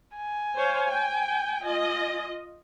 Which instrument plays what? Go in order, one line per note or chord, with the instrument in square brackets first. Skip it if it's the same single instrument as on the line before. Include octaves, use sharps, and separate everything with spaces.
[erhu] G#5
[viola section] C5 C#5 F5
G5
F4 D#5